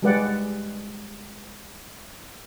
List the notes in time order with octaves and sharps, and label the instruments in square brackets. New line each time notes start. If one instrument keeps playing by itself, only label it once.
[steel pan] G3 G#3 G4 B4 D5 F#5